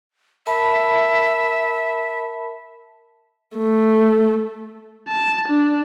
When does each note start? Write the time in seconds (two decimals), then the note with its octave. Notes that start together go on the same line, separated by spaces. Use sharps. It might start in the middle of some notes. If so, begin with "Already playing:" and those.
0.47 A#4 E5 A5 B5
3.56 A3
5.09 A5
5.48 D4